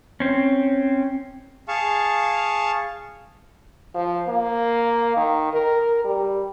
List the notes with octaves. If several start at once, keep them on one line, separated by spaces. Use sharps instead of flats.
C4 C#4
G#4 F5 A5 C#6
F3
A#3
D#3
A#4
G3